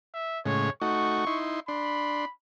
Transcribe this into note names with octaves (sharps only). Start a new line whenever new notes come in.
E5
A2 C#3 G#3 C#5
A3 D#4 F#4 C#6
D#4 E4 C6
D4 B5 C6